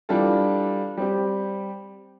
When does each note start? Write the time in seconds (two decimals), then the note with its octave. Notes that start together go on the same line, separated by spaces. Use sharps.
0.09 E3 G3 D4 F4 A4
0.97 G3 C4 G4